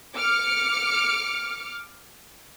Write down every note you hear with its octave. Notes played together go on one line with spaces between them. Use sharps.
D6 F6 C#7